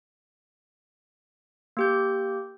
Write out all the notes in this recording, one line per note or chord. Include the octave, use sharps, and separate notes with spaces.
A#3 G4 G6